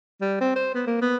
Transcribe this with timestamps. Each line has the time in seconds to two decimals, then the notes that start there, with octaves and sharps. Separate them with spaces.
0.21 G3
0.41 C4
0.55 C5
0.75 B3
0.87 A#3
1.01 B3